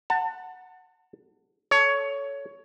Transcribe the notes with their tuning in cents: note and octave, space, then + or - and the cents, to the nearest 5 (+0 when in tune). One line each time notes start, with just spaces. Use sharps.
F#5 +0 A5 +30
A4 +0 C#5 +15